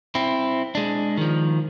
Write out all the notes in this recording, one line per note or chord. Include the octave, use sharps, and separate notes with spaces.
C4 E4
G#3 D4
D#3 F3